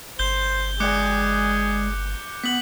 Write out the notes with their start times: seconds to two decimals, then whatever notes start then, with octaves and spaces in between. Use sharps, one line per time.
0.19 G1 C5 G6 G7
0.80 G#3 G#4 D5 G#5 D6 F#6 C#7
2.44 B3 B6 F#7